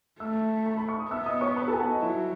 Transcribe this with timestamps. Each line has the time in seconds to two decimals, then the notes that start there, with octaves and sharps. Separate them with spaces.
0.20 A3 E5 E6
0.66 A5
0.77 B5
0.89 C#6
1.00 D#6
1.11 B3 E5 E6
1.26 D#5 D#6
1.41 C#5 C#6
1.56 B4 B5
1.68 A4 A5
1.73 G#5
1.79 F#4 F#5
1.91 D#5
2.02 F#3 E4 E5